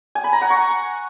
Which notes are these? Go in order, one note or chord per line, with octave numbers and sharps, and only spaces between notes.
G#5
B5
A#5
F#5
C#6